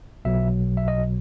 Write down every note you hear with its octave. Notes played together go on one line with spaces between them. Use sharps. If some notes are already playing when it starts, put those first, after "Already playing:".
B1 B2 F#3 E5
E5
D#5